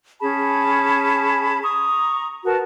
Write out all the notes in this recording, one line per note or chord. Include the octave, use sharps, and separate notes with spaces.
C#4 G#4 A5 B5
A#5 C#6 D#6
F#4 A#4 B4 A5